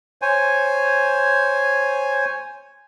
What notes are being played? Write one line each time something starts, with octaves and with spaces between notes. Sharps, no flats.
C5 C#5 G#5